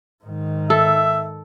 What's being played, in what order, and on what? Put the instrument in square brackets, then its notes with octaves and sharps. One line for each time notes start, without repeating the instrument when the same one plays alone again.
[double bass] G#2 D#3
[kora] A4 [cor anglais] E5